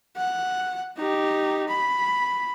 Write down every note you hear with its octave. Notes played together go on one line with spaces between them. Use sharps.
F#5
D#4 G4
B5